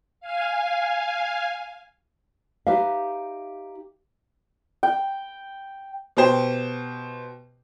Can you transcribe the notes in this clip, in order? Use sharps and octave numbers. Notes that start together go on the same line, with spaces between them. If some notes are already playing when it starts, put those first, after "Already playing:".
F5 G#5
D#4 G4 B4 E5 F5
G5
B2 G4 C5